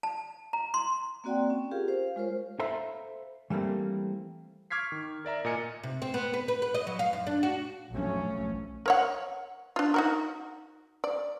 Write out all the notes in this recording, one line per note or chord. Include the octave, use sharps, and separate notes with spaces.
A5
A#5
C6
A#3 C4 F#4 D5 F#5 G5
C#4
F4 G4 G#4 A#4 F5
C5 F5
G#3 F4 A#4 C5 C#5
A4 C5 E5 F5 A#5 B5
E3 G3 A3 A#3 C4
C#6 D6 F6 G#6 B6 C7
D#3
A#4 D5 E5 A#5
A#2 A#4 D#5 G#5 C#7
C3
C4
B3
B4
B4
B4
D#5
F#3
F5
F#2
D4
F#4
B1 F3 F#3 A3 C#4
A#4 C#5 F#5
D4 F4
D#4 F#4 A#4
D5